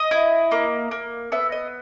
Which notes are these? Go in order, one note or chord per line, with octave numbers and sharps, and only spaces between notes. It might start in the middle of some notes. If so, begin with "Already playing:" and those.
Already playing: D#5
E4
A#3
A#3
B3 E5
D#5